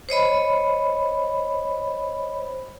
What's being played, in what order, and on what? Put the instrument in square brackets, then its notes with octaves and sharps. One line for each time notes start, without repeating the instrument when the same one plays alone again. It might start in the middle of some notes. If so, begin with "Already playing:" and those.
[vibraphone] C5 C#5 D#5 B5